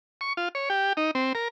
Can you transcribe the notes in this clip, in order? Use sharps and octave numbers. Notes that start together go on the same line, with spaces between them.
C#6
F4
C#5
G4
D#4
C4
A#4